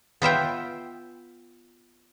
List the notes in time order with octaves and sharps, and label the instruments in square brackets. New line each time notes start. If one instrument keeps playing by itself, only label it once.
[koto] B3 F4 E5 G5